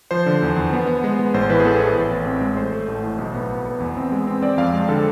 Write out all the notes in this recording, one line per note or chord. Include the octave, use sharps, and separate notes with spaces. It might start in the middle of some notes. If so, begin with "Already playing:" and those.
F3 C5
D3
E2
E2
B3
B3
G#3
B3
A1 C5
E3 B4
G#4
B3 A4
E3 B4
A1
A1
C4
G#3
A3 C5
A3
A1
A2
B1
B3
B3
B3
E2
C4
G#3
C4
C4 D5
F2 F5
G#3
D3 A4